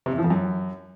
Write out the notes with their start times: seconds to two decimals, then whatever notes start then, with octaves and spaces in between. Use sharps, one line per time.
0.06 C3
0.12 E2
0.18 F3
0.24 F2
0.30 F#2